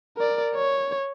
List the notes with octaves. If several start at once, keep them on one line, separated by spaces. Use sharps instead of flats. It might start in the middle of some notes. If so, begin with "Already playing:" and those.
A#4 D5
C#5